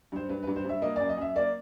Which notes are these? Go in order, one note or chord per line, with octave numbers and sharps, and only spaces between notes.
G2 C5
G2 B4
B4
G2
C5
G2 E5
A#3 D#5
D5
F#2
D#5
F#2 E5
A#3 D5